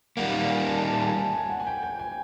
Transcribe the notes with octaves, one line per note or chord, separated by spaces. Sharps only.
D#3 G3 A#3 F#5
F5
G#5
A5
A5
G#5
A5
G#5
F#5
G#5
G5
G5
G#5